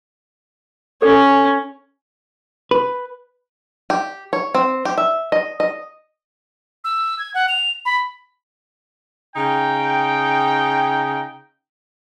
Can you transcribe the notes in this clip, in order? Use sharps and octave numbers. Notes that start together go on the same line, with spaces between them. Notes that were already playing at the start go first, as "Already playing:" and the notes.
C#4 A4 D5
B4
G4
C#5
C4
G4
E5
D#5
D#5
E6
G#6
F#5
F7
B5
C#3 D#4 G5